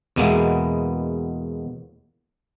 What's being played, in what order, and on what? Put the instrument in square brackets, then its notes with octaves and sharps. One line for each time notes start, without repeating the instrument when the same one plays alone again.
[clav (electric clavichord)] E2 B2 G#3 A#3 B3 E4